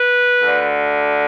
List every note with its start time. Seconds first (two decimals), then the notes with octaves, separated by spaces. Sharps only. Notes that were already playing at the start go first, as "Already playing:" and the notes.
Already playing: B4
0.41 D2 D3